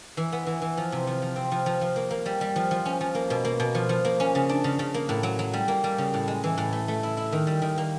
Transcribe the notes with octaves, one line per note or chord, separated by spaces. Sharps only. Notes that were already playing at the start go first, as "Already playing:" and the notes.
E3
B3
E3
E3
F3
C3
F3
F3
C4
F3
F3
F3
A#3
A#3
G3
G3
F3
F3
C#4
F3
A#3
B2
A#3
B2
F3
F3
A#3
C#4
C#3
D4
C#3
C#3
A#3
A2
F#3
F#3
G3
A#3
G3
C#3
A2
G#3
E3
A2
A3
A3
E4
E4
D#3
G3
D#3
A#3